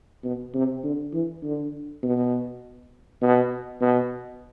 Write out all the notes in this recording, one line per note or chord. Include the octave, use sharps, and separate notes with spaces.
B2
C3
D3
E3
D3
B2
B2
B2